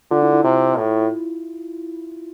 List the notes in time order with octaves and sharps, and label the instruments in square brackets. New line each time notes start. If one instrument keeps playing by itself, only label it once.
[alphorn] D3 [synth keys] F4
[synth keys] E4
E4
[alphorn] C3
A2